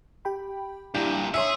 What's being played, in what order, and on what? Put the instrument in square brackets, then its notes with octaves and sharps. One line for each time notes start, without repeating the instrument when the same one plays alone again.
[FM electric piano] G4 G5 B5
[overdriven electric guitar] G2 A#2 [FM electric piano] D4 E4 [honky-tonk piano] G4
[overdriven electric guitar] G#4 [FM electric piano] C#5 C#7 [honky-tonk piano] E5 C6